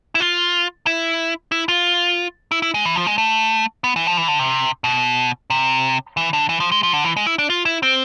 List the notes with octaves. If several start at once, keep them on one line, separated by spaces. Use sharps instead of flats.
E4
F4
E4
E4
F4
E4
E4
G#3
E3
F3
G#3
A3
B3
E3
F3
E3
D3
C3
B2
C3
E3
D3
E3
F3
G#3
F3
D3
E3
G#3
E4
D4
F4
E4
C4